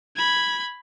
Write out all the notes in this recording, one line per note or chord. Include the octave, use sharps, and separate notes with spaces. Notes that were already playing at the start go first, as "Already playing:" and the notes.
B5 G#6